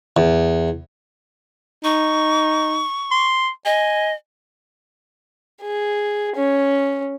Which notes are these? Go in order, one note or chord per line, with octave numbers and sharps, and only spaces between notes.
E2
D#4 C#6
C6
D#5 G#5
G#4
C#4